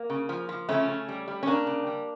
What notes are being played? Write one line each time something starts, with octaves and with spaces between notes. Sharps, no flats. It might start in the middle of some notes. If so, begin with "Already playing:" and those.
Already playing: A#3
C#3
F3
F3
C#3 A3 C#4
C#3
G3
G3
C#4
C#3 A#3 D4
C#3
G3